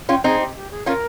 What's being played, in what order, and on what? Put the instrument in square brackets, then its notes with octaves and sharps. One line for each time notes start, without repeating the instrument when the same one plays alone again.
[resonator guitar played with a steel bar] C#4 F4 [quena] G5
[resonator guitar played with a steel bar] C4 D#4 [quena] G#4
[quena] G4
G4
G#4
[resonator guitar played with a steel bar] C#4 F4 [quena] A#4